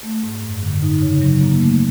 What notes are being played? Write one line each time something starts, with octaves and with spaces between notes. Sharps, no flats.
A3
G#2
F#2
D3
D#4
C#3
F#3
A#3
A3